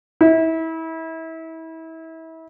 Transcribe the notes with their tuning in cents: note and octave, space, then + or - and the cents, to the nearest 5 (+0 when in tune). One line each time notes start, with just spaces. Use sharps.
E4 -30